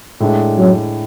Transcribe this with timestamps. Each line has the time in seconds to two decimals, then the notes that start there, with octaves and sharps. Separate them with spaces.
0.20 A2 G#3 D4
0.58 F#2 F#3